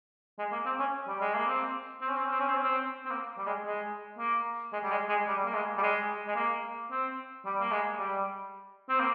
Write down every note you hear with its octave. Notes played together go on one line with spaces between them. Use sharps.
G#3
A#3
C4
C#4
G3
G#3
A#3
C4
C4
C#4
C4
C#4
C4
C#4
C4
C#4
C4
C4
A#3
G3
G#3
G#3
A#3
G#3
G3
G#3
G#3
G3
A#3
G#3
G3
G#3
G#3
A#3
C4
G3
A#3
G#3
G3
C4
A#3